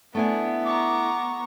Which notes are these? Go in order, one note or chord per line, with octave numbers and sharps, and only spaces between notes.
A3 B3 D4 E4 G#5
A#5 C#6 D6